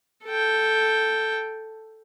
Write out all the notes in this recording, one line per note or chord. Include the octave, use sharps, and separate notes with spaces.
A4 G5